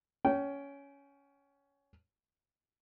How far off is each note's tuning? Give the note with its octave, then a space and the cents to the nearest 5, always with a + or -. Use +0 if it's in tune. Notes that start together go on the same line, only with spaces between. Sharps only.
C#4 +15 G5 -20